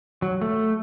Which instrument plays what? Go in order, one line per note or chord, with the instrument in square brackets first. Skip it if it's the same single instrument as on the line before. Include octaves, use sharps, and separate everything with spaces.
[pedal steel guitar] F#3
A3